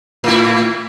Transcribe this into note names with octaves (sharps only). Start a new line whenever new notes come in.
A2 E4